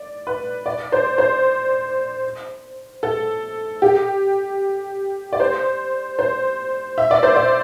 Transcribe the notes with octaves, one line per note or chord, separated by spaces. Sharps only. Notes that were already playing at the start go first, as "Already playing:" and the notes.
Already playing: D5
B4
D5
C5
C5
A4
G4
D5
C5
C5
E5
D5
C5
D5